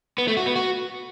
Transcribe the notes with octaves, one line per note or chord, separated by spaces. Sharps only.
B3
A3
F#4
B3
F#4